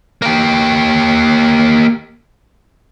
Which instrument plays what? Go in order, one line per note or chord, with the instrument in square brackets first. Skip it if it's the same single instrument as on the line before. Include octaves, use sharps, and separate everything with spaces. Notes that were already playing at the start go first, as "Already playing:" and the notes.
[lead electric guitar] A#3 G4